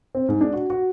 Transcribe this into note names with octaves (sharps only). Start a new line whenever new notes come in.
C4
G#2
D4
F#4
F#4